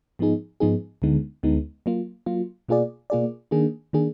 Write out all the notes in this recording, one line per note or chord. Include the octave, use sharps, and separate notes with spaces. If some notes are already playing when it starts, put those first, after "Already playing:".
G#2 F3 B3 D#4 G#4
G#2 F3 B3 D#4 G#4
D2 D3 G#3 B3 D#4
D2 D3 G#3 B3 D#4
F#3 A#3 F4
F#3 A#3 F4
B2 A#3 F4 G#4 D5
B2 A#3 F4 G#4 D5
D#3 A#3 D4 G#4
D#3 A#3 D4 G#4